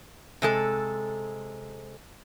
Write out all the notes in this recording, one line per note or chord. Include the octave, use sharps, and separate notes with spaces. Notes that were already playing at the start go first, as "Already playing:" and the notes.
C3 G#3 A4